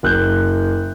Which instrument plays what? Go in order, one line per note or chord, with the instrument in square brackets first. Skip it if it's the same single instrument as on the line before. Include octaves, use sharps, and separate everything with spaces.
[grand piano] F#1 F#6 G6